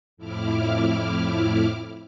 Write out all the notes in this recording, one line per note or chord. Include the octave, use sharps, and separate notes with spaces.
F2 A2 E4 D6 F6